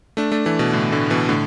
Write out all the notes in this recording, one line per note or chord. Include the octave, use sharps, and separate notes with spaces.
A3 D4
A3 D4
E3 A3
B2
A2 D3
A2 D3
B2 E3
A2 D3